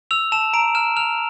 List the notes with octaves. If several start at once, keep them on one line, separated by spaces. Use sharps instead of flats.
E6 F7
A5 E7
A#5 D7
F6 E7
F6 F7